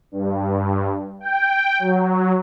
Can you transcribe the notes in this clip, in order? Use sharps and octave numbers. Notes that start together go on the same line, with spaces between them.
G2
G5
F#3